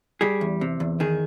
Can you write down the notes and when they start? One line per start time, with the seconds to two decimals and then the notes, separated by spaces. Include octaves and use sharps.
0.21 G3 G#4
0.41 E2
0.61 C3
0.80 E2
1.00 D#3 G#4